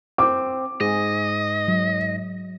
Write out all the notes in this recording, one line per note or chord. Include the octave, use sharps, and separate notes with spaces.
C4 C5 D6
G#2 G#4 D#5
F#3